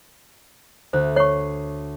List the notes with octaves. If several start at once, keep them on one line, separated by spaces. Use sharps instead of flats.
D2 C5
C#5 C#6 C7